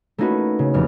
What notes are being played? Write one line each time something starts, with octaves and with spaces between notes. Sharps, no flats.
A3 A#3 C#4 D#4 F#4 B4
C#3
F1 E2 E3 F6